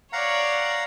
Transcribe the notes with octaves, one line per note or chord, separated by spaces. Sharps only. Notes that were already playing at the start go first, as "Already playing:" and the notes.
C#5 D5 F5 F#5 A#5